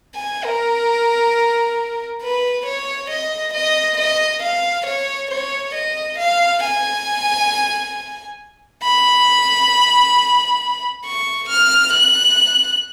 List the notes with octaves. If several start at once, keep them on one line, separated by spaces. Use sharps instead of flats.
G#5
A#4
B4
C#5
D#5
D#5
D#5
F5
C#5
C#5
D#5
F5
G#5
B5
C#6
F6
F#6